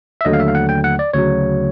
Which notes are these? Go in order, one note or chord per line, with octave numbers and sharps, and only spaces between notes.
E5
D#2 D3 F#3 A3 D#5
F5
E5
F5
F#5
G5
F#5
D5
D2 C#3 F#3 C#5